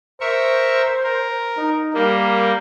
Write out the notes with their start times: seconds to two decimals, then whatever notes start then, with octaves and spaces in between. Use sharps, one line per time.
0.21 A#4 C5 E5 C#6
1.04 A#4
1.57 D#4
1.94 G3 A#3 A#4